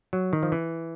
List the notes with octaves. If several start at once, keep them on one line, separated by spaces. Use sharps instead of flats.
F#3
D#3
F3
E3